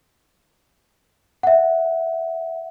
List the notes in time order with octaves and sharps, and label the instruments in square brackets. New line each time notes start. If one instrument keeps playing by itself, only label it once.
[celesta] E5 F#5